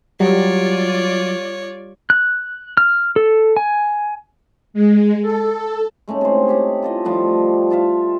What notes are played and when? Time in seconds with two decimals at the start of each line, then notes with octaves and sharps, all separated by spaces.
0.20 F#3 G3 F4 C#5 D5
2.10 F#6
2.77 F6
3.16 A4
3.57 G#5
4.74 G#3
5.22 A4
6.08 G#3 A3 C#4 D#4
6.21 C3 C5
6.47 D#4 G4 C#5
6.83 F4 A4 D#5
7.05 F3 G3 A3
7.70 F4 A4 E5 F5